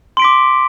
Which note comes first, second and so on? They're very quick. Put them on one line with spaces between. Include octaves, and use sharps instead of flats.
C6 D7 B6 D6